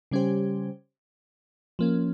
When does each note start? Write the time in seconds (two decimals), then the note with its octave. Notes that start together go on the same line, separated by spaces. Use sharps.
0.11 C#3 G3 C#4 G4 C5
1.79 F3 A#3 C#4